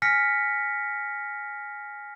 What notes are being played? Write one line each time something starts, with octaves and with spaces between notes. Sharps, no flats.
G#5 F6 A#6 B6 C#7